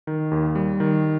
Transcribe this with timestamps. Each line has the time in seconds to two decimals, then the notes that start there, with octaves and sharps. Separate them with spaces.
0.07 D#3
0.31 D#2
0.55 G3
0.80 D#3